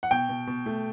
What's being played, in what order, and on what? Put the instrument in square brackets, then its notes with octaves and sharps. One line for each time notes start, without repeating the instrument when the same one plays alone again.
[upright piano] F#5
[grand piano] B2 [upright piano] G5
[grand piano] B2
B2
A3